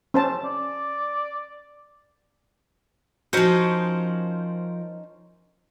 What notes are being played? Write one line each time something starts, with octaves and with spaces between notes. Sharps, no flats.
C#4 C5 A5
D5
F3 C#4 D#4 F#4 A#4 C5